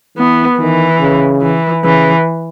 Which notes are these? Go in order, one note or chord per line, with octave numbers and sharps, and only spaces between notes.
E3 B3
D#3 E3
C#3
E3
C#3 E3